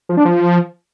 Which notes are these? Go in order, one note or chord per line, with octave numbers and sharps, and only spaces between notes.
F3
D4
F3